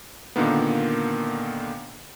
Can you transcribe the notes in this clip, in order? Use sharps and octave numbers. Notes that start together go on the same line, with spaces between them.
A#2 D3 D#3 A#3 B3